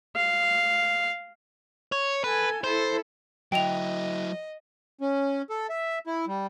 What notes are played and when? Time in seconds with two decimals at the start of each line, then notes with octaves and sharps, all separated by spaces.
0.16 F5
1.92 C#5
2.24 A4 B4 G#5
2.64 E4 A4 C5
3.52 F#3 E4 D#5 G5 F7
5.01 C#4
5.50 A4
5.70 E5
6.07 E4
6.27 G3